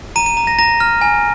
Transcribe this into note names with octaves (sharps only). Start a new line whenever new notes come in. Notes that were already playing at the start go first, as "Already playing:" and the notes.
A#5 D#7
D#7
A#5
A#6
A#5 A#6
F6
G#5